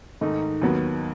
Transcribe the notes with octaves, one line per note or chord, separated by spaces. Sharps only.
G#2 D#3 A3 D#4
D#2 D#3 F#3 B3